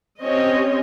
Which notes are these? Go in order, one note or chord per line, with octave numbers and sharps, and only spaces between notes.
C4 C#4 G4 C#5 D#5